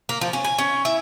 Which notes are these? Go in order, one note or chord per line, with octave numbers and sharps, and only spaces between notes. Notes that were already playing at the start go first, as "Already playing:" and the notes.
A#3
F3
C#4
G#5
C#4
E4